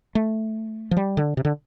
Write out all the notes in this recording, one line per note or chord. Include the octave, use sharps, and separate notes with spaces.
A3
F3
G3
D3
C3
D3